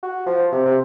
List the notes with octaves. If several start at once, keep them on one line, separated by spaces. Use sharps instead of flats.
F#4
F3
C3
C3